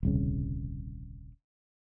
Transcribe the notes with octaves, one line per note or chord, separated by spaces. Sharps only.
D#1 C2 C#3